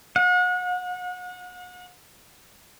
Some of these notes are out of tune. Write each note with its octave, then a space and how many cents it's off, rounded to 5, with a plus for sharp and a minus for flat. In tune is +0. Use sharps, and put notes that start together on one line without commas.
F#5 -35